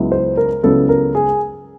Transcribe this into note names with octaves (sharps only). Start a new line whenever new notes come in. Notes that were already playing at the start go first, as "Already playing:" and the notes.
Already playing: C#2 C#3 F#3 B3 E4
C5
A#4
C#2 C#3 F#3 B3 E4 A4
A#4
G#4